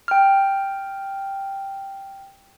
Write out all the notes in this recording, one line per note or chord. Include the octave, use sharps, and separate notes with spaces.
G5 F6